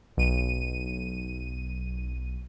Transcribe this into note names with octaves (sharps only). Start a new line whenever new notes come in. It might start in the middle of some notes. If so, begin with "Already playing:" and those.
B1 D#7